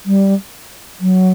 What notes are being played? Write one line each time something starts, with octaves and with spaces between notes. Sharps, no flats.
G3
F#3